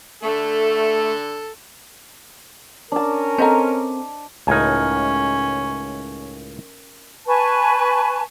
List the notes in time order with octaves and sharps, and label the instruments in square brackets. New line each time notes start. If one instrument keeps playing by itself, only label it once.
[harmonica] D3 A4 [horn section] A3
[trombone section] C#4 A#4 [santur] D4 A5
[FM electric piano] C4 A4 [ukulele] C5 D#5 A#5
[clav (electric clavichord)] C#2 A2 D#4 [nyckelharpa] C#4 [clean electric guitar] A#4 G#5
[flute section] B4 G#5 A5 C#6